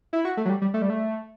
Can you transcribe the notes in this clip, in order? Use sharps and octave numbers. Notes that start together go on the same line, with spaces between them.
E4
F#4
A3
F#3
G3
G3
A3
G3
A3